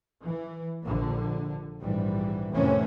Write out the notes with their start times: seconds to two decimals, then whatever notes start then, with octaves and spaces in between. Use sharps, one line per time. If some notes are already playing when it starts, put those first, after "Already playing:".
0.23 E3
0.86 A#1 D3
1.81 A#1 G#2 E3 G3
2.52 F2 A2 C3 D#3 E3 C#4